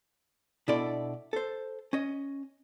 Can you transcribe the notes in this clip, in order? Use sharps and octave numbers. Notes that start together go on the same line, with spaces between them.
B2 D4 E4 A4 D5 C6
A4 C5
C#4 D#5